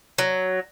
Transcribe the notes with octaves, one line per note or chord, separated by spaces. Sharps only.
F#3